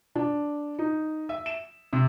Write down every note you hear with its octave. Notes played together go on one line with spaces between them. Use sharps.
D4
D#4
E5
E7
C3